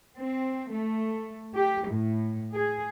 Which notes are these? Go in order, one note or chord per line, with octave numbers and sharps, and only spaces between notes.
C4
A3
G4
A2
G#4